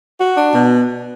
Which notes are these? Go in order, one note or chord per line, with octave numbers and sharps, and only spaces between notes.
F#4
D4
B2